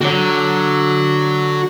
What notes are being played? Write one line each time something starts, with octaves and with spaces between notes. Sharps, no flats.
D3 F#4 C#5